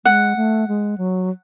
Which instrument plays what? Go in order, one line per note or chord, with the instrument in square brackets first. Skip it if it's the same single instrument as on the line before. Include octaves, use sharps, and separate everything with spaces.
[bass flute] G#3 [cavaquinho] F#5
[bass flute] A3
G#3
F#3